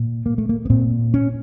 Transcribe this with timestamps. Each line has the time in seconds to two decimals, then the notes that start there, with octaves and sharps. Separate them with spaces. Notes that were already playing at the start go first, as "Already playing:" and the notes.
Already playing: A#2
0.26 A#3
0.38 A3
0.49 A#3
0.65 B3
0.70 A#2 C4
1.14 C#4